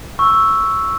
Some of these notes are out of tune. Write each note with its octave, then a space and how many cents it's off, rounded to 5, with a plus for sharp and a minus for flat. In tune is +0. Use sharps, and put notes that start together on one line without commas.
C#6 +0 E6 +0